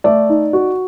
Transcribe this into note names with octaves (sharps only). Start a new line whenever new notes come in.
A3 D5
D#4
F#4